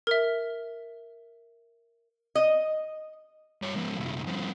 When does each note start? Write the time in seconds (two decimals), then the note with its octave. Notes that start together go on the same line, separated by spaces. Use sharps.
0.07 A#4 E5
2.35 D#5
3.62 G2 C#5
3.76 G#2 F3
3.98 C2 F#2
4.27 G2 F3